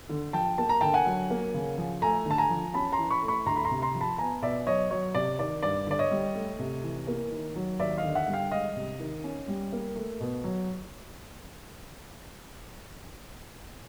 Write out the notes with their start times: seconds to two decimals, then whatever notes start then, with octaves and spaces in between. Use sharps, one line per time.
0.09 D3
0.33 F3 G5 A5
0.58 A#3 A5
0.69 A#5
0.81 D3 G5 A5
0.94 F#5 G#5
1.06 F#3
1.30 A#3
1.54 C#3
1.78 F3
2.02 A3 G#5 A#5
2.26 D3 A5
2.38 G#5 A#5
2.50 F3
2.74 C#4 A5 B5
2.92 A#5 C6
2.98 E3
3.11 B5 C#6
3.22 A3
3.28 B5 C#6
3.46 D2 A#5 C6
3.56 B5
3.65 A#5 C6
3.71 C3
3.82 A#5 C6
3.95 F3
4.01 A5 B5
4.18 B3 G#5 A#5
4.42 B2 D5 E5
4.67 F#3 C#5 D#5
4.91 F#3 C#5
5.15 C3 D5
5.39 D#3 D5
5.63 G2 D5
5.87 D3 D5
5.99 C#5 D#5
6.11 G3
6.35 A3
6.59 C3
6.83 E3
7.07 A#3
7.32 D#3
7.56 F#3
7.79 D#2 D5 E5
7.98 D#5 F5
8.04 D3
8.15 E5 F#5
8.28 G3
8.33 F5 G5
8.51 G#3 D#5 F5
8.76 C3
9.00 D#3
9.24 C#4
9.48 G3
9.72 A#3
9.96 A3
10.20 B2
10.44 F#3